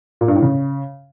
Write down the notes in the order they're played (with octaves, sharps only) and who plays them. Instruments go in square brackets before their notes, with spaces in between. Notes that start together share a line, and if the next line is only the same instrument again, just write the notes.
[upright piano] A#2
G2
A2
C#3